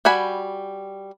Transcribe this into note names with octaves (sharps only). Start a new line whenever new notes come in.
G3 F#4 G#5 B5